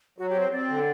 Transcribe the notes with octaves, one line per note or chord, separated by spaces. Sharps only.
F#3 F#4
G4
C4
C5
C4 D5
D3